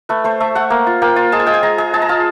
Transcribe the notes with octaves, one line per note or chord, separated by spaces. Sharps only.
A3 B4
A3 C5
A3 E5
A3 F#5
A#3
F4
A#3 G5
F4
G#3 A5
G#5
G#3 G5
G#5
G#3 A#5
G#3
G#3 A5
A#5
F4 A5